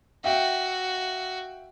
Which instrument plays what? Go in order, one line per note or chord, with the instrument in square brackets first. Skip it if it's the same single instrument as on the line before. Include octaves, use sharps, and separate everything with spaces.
[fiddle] F#4 [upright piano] E5 F5 G5